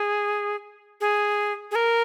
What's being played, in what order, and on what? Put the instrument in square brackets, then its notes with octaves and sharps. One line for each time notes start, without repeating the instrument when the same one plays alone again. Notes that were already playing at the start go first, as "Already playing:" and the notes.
Already playing: [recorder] G#4
G#4
G#4
A#4